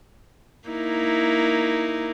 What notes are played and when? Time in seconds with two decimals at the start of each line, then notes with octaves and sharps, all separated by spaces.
0.68 A#3 D#4 E4